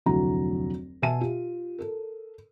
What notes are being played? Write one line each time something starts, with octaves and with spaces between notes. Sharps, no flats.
F1 D2 F#3 E4 F#4 A#5
B2 E5 G#5 A5 D#7
F4 G4
A4 A#4